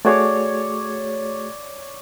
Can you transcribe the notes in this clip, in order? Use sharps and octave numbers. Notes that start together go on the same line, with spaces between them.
A3 F#4 G#4 C#5 D5